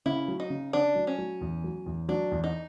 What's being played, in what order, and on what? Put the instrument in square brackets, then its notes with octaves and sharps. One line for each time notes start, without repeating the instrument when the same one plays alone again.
[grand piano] C#3 [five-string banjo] E4
[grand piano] F#3
[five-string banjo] D#4
[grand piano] C#3
[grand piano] C#3 [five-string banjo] D4
[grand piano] F#3
[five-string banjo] C#4
[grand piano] F#3
E2
F#3
E2
[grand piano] F#3 [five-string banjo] D4
[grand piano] E2
[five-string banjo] D#4